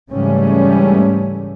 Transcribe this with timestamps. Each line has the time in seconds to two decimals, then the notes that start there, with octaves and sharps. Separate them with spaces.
0.11 G#2 C#3 E3 G3 A3 C#4